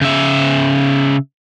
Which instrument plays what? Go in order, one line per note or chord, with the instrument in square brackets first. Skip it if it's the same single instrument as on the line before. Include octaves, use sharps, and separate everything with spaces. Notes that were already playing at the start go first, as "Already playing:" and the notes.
[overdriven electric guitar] C#3 E5